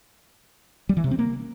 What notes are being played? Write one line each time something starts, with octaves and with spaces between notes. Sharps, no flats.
G3
E3
C3
C4
A#3